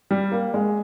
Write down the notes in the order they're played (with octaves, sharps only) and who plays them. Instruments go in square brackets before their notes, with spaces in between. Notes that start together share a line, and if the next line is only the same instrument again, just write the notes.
[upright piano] G3
A#3
G#3